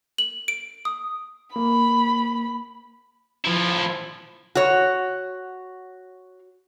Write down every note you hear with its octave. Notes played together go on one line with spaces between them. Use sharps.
F#7
D7
D#6
A#3 B5
F3 E4
F#4 C#5